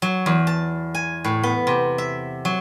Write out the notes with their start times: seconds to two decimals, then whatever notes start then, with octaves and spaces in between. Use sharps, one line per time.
0.02 F#3
0.26 E2
0.47 A5
0.94 G#5
1.24 A2
1.43 B3
1.67 C3
1.98 E5
2.45 F#3